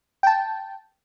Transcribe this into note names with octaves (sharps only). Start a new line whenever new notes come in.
G5 A5